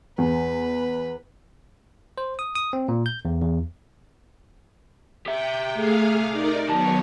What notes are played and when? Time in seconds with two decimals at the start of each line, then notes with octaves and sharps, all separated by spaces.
0.18 E2 B4
2.18 C5
2.39 D#6
2.55 D#6
2.73 C4
2.88 A#2
3.06 G6
3.25 E2
3.42 E2
5.26 G4 E5 G5
5.74 A3 G#4 F5
6.30 D#4 A#4 D5
6.69 D#3 F#3 B3 C#5 A5